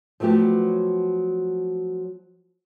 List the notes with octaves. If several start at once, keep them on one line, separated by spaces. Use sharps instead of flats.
F3 F#3 A3 B3 G4